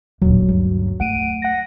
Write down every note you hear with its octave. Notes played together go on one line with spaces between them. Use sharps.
D#1 A1 D2 F#3
G2 C#3
A3 F#5 D7 D#7
F#5 A#6